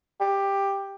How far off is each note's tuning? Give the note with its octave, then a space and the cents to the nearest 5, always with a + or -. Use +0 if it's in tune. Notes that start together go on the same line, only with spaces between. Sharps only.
G4 +10